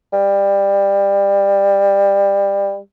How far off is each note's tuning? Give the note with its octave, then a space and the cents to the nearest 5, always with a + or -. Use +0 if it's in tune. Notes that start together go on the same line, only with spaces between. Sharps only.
G3 +20